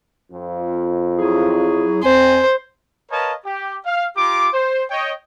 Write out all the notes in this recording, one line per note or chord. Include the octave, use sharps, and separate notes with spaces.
F2
F#3 E4 G#4
F2 C4 C5 G#5
A#4 B4 C#5 D#5 F5 A5
G4
F5
F4 G4 A#5 D6
C5
C#5 D#5 G5